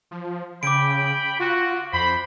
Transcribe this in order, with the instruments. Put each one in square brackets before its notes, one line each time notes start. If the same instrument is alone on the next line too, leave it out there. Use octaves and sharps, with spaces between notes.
[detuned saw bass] F3
[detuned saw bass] C#3 [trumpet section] G5 B5 [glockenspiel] D6 D7
[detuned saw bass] F4 [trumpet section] F#4
[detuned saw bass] F2 [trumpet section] C5 B5